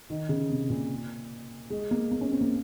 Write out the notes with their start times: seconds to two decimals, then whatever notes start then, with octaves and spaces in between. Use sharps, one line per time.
0.10 D#3
0.29 C#3
0.50 C3
0.70 A#2
1.70 G#3
1.91 A#3
2.11 A#3
2.21 C#4
2.31 C4
2.41 A#3